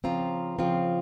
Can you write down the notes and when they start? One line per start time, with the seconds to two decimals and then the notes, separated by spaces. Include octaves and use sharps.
0.04 C#3 F3 C4 F4 A#5
0.59 C#3 F3 C4 F4